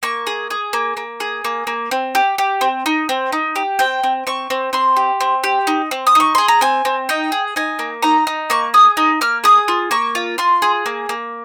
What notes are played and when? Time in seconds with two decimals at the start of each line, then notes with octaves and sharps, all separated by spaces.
0.03 A#3 C#6
0.27 G#4
0.50 G#4
0.73 A#3
0.97 A#3
1.20 G#4
1.44 A#3
1.67 A#3
1.91 C4
2.15 G4
2.38 G4
2.61 C4
2.86 D#4
3.09 C4
3.32 D#4
3.56 G4
3.79 C4 G5
4.03 C4
4.27 C4 C#6
4.50 C4
4.73 C4 C6
4.97 G4
5.21 C4
5.44 G4
5.67 D#4
5.91 C4
6.07 D#6
6.15 D#4 C#6
6.35 G#4 C6
6.48 A#5
6.61 C4 G#5
6.85 C4
7.09 D#4 G5
7.32 G#4
7.56 D#4 G#5
7.79 A#3
8.02 D#4 A#5
8.27 D#4
8.50 A#3 C#6
8.74 G#4 D#6
8.97 D#4
9.21 A#3 F6
9.44 G#4 D#6
9.68 F4
9.91 A#3 C#6
10.15 F4
10.38 F4 C6
10.62 G#4
10.86 A#3
11.09 A#3